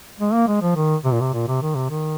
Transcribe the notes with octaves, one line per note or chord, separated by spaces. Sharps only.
G#3
A#3
G#3
F3
D#3
C3
A#2
C3
A#2
C3
D#3
C3
D#3